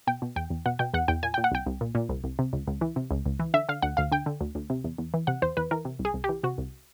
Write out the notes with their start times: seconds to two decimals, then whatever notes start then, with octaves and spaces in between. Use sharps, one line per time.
0.07 B2 G5
0.22 B2
0.36 E2 G5
0.50 E2
0.66 B2 F#5
0.79 B2 G5
0.94 E2 F#5
1.08 E2 G5
1.23 A#2 G#5
1.34 A#2 G5
1.44 F#5
1.51 C2 G5
1.66 C2
1.81 A#2
1.95 A#2
2.09 C2
2.24 C2
2.39 C3
2.53 C#2
2.67 C#2
2.81 E3
2.96 C3
3.11 C#2
3.26 C#2
3.39 E3
3.54 D3 E5
3.69 D3 F5
3.82 D2 F#5
3.97 D2 F5
4.12 D3 G5
4.26 D3
4.41 D2
4.55 D2
4.70 C3
4.84 E2
4.98 E2
5.14 E3
5.27 C3 F#5
5.42 E2 C5
5.57 E2 B4
5.71 E3 A#4
5.85 C3
5.99 C2
6.05 G#4
6.14 C2
6.24 G4
6.29 E3
6.43 C3 F#4
6.58 C2